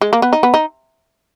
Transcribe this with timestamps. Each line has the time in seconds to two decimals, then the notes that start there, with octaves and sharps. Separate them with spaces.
0.01 G#3
0.13 A#3
0.22 B3
0.33 D#4
0.43 B3
0.54 D#4